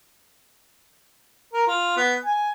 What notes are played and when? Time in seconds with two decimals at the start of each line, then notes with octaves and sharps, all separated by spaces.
1.53 A#4
1.67 F4
1.96 B3
2.24 G#5